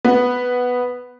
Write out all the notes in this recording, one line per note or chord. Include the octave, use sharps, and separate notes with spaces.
B3